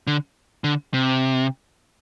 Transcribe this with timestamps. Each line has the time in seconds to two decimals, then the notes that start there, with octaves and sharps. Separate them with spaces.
0.07 D3
0.64 D3
0.94 C3